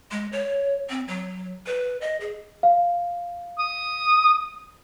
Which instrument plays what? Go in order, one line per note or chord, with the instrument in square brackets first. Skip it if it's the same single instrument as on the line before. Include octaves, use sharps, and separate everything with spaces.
[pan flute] G#3
C#5
C4
F#3
B4
D#5
G#4
[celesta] F5
[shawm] D#6